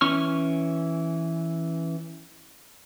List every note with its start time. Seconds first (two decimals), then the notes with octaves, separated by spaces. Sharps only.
0.01 E3 C#4 C#6 F6